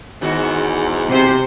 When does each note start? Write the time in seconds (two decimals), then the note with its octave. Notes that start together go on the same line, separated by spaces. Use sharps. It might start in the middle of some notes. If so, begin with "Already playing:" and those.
0.21 E2 G#2 D#3 F#4
1.08 C3 C5